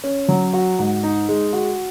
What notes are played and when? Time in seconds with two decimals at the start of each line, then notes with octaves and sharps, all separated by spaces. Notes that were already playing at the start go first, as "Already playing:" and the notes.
0.04 C#4
0.29 F#3
0.53 F#4
0.79 G#2
1.03 D#4
1.29 G#3
1.53 F#4